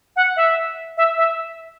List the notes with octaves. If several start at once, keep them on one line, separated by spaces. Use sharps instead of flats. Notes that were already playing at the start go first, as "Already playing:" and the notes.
F#5
E5
E5
E5